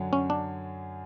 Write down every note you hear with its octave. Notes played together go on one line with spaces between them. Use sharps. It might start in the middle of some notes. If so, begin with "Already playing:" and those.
Already playing: F#2 D3 F#3
C#4
D4